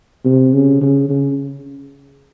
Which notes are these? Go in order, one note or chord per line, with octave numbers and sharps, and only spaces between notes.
C3
C#3
C#3
C#3